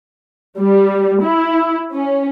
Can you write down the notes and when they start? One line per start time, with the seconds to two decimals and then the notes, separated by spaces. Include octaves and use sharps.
0.59 G3
1.23 E4
1.94 C#4